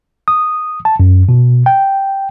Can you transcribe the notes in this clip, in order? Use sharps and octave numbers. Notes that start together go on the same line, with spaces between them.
D#6
A5
F#2
B2
G5